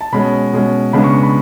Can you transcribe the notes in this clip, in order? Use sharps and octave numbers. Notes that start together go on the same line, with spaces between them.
A5
B2 G#3 C#4 B5
B2 G#3 C#4
C#2 C#3 G#3 B3 D4 B5
C#6
C#6
B5